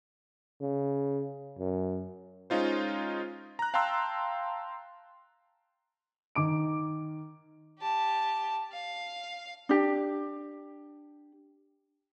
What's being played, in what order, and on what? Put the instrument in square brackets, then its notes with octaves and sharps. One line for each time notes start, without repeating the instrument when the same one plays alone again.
[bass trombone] C#3
F#2
[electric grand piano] G#3 C#4 D#4 F4 C5
A#5 F#6
F5 G5 A5 A#5 C6 E6
[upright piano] D#3 D6 D7
[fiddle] G4 A5
F5
[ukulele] D4 G4